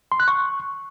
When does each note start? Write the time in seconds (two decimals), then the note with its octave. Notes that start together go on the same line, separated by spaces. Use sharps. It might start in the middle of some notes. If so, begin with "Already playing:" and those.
0.12 C6
0.20 F#6
0.28 C#6